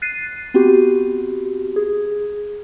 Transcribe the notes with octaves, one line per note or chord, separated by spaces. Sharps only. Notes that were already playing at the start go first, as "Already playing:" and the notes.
F#6 A6 C7 D#7
B3 C4 F#4 G4
G#4